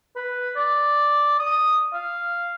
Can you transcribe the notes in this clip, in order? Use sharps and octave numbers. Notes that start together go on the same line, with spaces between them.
B4
D5
D#6
F5